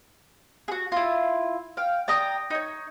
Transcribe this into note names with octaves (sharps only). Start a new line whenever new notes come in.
F#4 G#4
E4 F4
F5 G5
D5 G5 A#5 D#6
D#4 C#5